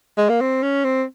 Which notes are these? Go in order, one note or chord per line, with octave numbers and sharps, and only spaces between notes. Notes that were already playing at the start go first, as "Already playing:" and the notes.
G#3
A#3
C4
C#4
C4